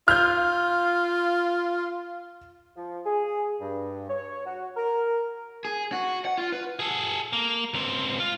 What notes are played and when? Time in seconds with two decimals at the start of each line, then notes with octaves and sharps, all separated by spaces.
0.08 F4 F6 G6
2.77 F3
3.06 G#4
3.60 G2
4.09 C#5
4.46 F#4
4.76 A#4
5.65 G#4
5.92 F#4
6.25 F#5
6.38 F4
6.52 B4
6.80 G#4 A4
7.33 A#3
7.74 C#2 C4
8.20 F4